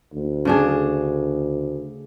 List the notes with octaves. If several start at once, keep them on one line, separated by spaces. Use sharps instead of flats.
D2
C#3 D4 G#4